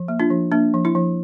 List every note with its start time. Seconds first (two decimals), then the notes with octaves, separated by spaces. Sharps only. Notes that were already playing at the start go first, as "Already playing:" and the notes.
Already playing: F3
0.08 A#3
0.20 D4 F4
0.30 F3
0.52 A#3 D4
0.74 F3
0.85 E4
0.95 F3